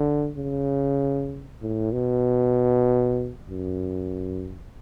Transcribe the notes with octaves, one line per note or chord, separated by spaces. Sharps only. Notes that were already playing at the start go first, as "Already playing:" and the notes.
Already playing: D3
C#3
A2
B2
F#2